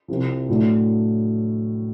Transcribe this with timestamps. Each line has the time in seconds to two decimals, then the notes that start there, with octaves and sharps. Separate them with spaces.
0.08 C2 C3 F3
0.48 A2 F#3 A3 D4